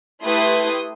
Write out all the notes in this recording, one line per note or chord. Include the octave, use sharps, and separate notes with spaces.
A3 E4 G4 B4 C6 D#6